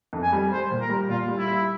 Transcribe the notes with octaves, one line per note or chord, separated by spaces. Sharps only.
F2
G#5
G3
G3 C5
A#2
A#4
G3
A#2 F4
G3
E4
G3